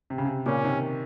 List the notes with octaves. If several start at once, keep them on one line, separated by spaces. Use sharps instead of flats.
C3
C#3
C3
A#2 C#3 C#4
C3 D#3